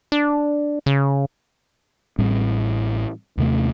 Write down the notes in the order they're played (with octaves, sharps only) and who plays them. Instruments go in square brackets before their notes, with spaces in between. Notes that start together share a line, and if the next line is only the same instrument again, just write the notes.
[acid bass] D4
C#3
[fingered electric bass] A1 A2 G3 C4
D#2 C3 A3